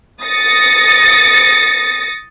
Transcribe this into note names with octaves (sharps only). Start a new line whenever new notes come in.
D#6 A6 A#6 C#7